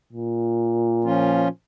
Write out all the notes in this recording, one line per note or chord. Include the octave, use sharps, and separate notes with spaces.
A#2
F3 C#4 F4